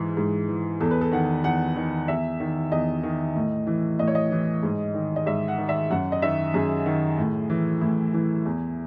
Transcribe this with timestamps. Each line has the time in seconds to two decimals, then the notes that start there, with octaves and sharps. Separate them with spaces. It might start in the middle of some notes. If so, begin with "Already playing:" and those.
Already playing: G#2 E3
0.17 G#2
0.48 E3
0.80 E2 A4
0.91 B4
1.01 A4
1.12 D#3 F#5
1.44 E2 F#5
1.76 D#3
2.08 E2 E5
2.40 D#3
2.71 E2 D#5
3.03 D#3
3.35 A2
3.67 E3
3.99 A2 D#5
4.08 C#5
4.15 D#5
4.32 E3
4.63 G#2
4.94 D#3
5.16 D#5
5.26 G#2 E5
5.48 F#5
5.58 D#3
5.69 E5
5.90 F#2 F#5
6.12 D#5
6.22 D#3 E5
6.54 F#2 G#4
6.86 D#3
7.18 A2
7.50 E3
7.81 A2 E4
8.14 E3
8.45 E2